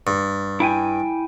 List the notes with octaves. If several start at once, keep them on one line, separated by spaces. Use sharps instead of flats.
G2
E4 G5 G#5